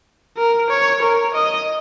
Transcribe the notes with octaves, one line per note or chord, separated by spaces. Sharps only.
A#4
C#5
A#4
D#5